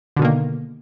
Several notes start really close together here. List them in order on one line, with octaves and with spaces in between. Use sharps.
D3 B2 D#3 A#3